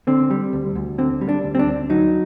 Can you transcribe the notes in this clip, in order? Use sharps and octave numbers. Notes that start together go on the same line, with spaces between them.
D3 C4
G3
D2
D2
D3 C4
G3
D4
D2
C4
D4
D2
F#3 D#4